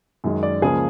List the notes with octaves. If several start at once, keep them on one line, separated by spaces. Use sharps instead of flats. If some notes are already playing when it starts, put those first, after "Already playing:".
F#2 D#3 G#3
D5
C#2 C#3 F3 A#3 G#4